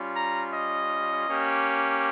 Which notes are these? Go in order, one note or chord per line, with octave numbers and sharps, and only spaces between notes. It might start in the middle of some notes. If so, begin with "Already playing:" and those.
Already playing: G3 C#4 F4
A#5
D#5
A#3 C#4 G4